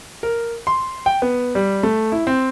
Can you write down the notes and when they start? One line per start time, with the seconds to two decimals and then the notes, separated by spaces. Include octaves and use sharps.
0.23 A#4
0.67 C6
1.06 G5
1.22 B3
1.55 G3
1.83 A3
2.12 E4
2.27 C4